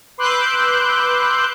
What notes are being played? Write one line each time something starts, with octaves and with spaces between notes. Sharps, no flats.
B4 C6 D6 E6 F#6 G6